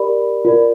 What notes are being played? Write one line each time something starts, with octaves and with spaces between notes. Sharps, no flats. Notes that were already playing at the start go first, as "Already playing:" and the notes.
Already playing: G4 A#4 D5 B5
F4 A#4 D5